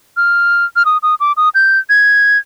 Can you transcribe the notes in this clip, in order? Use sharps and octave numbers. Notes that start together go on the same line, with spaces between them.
F6
F6
D#6
D#6
D6
D#6
G6
G#6